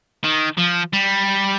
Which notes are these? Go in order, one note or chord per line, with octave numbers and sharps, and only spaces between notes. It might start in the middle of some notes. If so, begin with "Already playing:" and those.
D#3
F3
G3